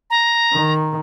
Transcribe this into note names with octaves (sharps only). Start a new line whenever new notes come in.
A#5
D#3